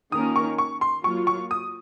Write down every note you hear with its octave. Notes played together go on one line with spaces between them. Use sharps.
D#3 A#3 C#4 F4 A#4 D#6
C#6
C#6
C6
F#3 A#3 F4 C#6
C#6
D#6